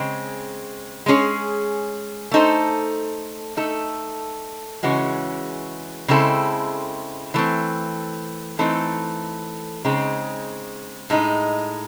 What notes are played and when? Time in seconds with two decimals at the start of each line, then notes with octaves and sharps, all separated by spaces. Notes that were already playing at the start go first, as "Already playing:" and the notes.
Already playing: C#3 G#3 C4
1.06 G#3 C#4 G#4 C#5
2.32 A3 D#4 A4 C5
3.57 A3 D#4 A4
4.83 C#3 E3 G#3 C#4 F#4
6.08 C#3 G#3 C4 E4 A4
7.34 E3 A3 C4
8.59 E3 A3 C4 D#4 A4
9.85 C#3 G#3 C4 D#4
11.10 A2 G#3 D#4